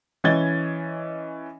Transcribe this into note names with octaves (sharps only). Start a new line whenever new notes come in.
E3 C#4 D#5 G#6 A6 G7